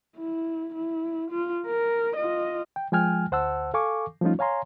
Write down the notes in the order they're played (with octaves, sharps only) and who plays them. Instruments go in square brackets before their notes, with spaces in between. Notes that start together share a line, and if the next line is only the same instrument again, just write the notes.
[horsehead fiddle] E4
E4
F4
A#4
F4 D#5
[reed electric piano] G5
F3 G#3 G5 G#5 F6
D2 C5 F#5 A5 E6
A4 F5 G#5 C#6 D6
F3 G3 A3 C#4 D#4 F4
C#5 F5 G#5 A#5 C6